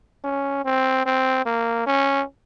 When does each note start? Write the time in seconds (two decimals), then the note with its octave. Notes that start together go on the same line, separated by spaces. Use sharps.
0.24 C#4
0.65 C4
1.06 C4
1.46 A#3
1.87 C#4